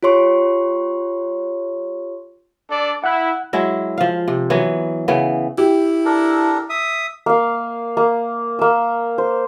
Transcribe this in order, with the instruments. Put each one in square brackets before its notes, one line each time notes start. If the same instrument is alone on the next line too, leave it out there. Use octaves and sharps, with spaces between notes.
[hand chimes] F4 G4 C#5 C6 C#6
[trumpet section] D4 A4 D5
[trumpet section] E4 [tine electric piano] F#5 F#6
[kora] F#3 G#3 E4
F3 F5
C3
E3 F#3 B3
C#3 E3 B3
[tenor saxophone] E4 [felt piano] G4
[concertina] D4 A4 A#4
E5 D#6
[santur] A#3 F5
A#3
A#3 E6
C5